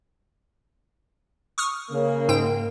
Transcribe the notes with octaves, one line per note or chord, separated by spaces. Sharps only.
C#6 D#6 F6
C#3 A#3
G#2 G5